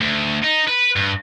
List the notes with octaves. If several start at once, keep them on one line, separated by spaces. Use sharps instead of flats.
D2
D#4
B4
G2